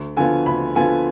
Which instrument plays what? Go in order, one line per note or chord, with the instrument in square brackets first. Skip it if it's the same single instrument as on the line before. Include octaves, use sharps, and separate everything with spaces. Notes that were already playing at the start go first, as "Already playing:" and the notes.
Already playing: [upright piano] D2
D3 F3 B3 F4 G#5
D2 B5
D3 F3 B3 F4 G#5